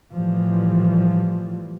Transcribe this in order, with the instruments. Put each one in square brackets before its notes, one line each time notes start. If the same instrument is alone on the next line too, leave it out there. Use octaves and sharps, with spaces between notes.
[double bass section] A2 E3 F3 G3